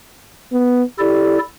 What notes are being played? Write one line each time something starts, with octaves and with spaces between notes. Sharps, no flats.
B3
E4 G4 A4 D5